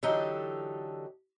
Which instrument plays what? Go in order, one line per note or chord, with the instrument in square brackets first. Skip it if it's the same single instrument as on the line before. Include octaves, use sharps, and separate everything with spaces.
[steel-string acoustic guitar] D3 E3 F#3 D#4 G4 A4